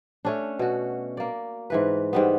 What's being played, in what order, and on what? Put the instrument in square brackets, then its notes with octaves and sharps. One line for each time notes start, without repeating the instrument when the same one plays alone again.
[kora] A3 C#4 D4
B2 F#4
A#3 D5
G#2 E3 B4
G#2 G3 B3